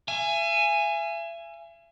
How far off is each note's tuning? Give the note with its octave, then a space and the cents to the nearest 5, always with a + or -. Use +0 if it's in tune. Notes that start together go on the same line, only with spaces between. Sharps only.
E5 +40 G#5 +0